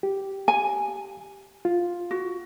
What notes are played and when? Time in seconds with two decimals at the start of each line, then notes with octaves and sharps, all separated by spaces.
0.03 G4
0.48 G#5
1.65 F4
2.11 F#4